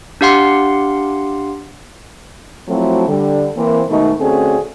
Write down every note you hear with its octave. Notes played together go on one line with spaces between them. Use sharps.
D4 G4 F5 F#5 C6
F3 F#3 A3 C4 E4 F#4
D3 G3
E3 A#3 C4
G#2 B2 D#3 A3 D#4
D3 A3 C4 C#4 F#4 G#4